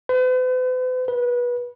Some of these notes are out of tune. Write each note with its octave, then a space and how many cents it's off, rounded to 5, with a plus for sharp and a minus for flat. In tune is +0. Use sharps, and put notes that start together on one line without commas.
B4 +45
B4 -25